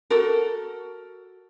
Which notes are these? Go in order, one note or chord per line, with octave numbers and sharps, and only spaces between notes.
F#4 A4 A#4